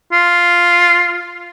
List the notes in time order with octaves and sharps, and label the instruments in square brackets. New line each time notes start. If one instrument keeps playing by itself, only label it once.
[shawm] F4